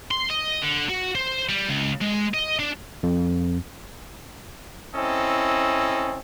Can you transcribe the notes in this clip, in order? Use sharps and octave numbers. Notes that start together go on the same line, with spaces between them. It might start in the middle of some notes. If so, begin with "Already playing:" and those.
C6
D#5
D3
F#4
C5
G3
C#2
G#3
D#5
D4
F2
C4 C#4 E4 A4 D#5